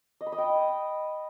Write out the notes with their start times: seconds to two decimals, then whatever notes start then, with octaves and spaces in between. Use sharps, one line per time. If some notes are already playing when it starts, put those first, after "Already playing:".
0.21 D#5
0.26 B5
0.32 D#5
0.38 G5